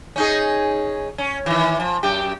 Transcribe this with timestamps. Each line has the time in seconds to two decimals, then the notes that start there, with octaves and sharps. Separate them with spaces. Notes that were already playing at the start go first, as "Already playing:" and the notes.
0.16 C#4 D#4 G#4
1.18 C#4
1.46 D#3 E3
1.80 F3
2.03 F#2 G4